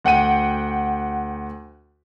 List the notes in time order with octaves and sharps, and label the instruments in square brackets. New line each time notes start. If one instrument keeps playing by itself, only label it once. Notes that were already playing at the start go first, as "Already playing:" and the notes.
[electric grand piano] D2 F#5 G5 D#7